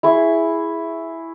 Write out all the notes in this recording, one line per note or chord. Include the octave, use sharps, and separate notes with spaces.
E4 G#4 C#6